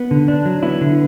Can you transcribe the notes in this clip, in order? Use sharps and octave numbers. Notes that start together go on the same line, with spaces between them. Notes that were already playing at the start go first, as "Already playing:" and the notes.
Already playing: B3
D3
D4
F#3
B3 E4
D3